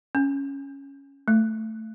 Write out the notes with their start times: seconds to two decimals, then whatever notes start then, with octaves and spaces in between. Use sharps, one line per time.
0.15 C#4
1.28 A3